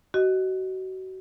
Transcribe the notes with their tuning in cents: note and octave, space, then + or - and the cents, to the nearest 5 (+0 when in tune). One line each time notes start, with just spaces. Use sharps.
F#4 +30 D#5 +0